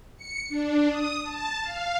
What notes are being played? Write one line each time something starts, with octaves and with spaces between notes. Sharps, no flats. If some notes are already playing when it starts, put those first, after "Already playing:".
C#7
D4
D#6
A5
F5